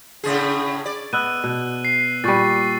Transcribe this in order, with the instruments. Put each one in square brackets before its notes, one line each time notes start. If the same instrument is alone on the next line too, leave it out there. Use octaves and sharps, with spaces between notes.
[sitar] A2 C#3 G#4
D5
[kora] B3 D#5 [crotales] E6 F#6 D#7
[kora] B2
[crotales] C7
[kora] A#2 G3 [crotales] C#6 A6